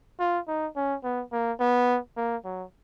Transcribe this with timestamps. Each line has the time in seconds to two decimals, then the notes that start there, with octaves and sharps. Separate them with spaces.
0.19 F4
0.48 D#4
0.76 C#4
1.04 B3
1.32 A#3
1.60 B3
2.17 A#3
2.45 F#3